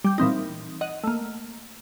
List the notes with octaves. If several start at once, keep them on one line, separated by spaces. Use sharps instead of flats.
G3 G6
A#2 E3 C4 D#4
D#5 F#5
A3 A#3